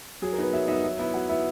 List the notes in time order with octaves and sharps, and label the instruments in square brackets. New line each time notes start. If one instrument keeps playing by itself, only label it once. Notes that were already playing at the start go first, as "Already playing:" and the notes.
[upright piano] F#3 [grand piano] G#4
[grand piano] A#4
[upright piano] B3 D#4 [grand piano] B4
[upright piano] F#3 [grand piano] E5
[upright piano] B3 D#4 [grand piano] E5
[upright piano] F#3 [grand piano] E5
[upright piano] B3 E4 [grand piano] E5
[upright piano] F#3 [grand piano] F#5
[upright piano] B3 E4 [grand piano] E5